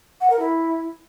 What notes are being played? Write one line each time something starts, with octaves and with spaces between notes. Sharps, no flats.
F#5
A#4
E4